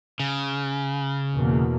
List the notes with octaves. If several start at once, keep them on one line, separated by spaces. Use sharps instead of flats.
C#3
E2 B2 A#3